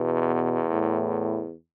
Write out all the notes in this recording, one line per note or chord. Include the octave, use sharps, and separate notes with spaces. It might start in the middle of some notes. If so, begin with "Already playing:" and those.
Already playing: E2 B2
A2